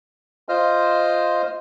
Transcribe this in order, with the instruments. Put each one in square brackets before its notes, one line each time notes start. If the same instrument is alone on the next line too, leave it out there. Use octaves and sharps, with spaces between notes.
[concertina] F4 C5 D#5 F6